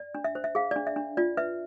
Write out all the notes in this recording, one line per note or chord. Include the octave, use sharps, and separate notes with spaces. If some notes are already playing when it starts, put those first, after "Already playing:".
Already playing: D5
D4
E5
C5
E5
G#4 F5
D4 D5
E5
D4
F4 D5
B4 E5